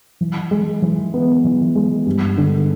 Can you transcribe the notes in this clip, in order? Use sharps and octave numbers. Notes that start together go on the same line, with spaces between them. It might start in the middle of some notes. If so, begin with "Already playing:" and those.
E3
G#3
E3
B3
E3
G#3
G2
D3